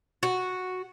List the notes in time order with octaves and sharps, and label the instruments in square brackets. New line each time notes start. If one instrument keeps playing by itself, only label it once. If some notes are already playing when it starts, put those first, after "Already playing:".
[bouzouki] F#4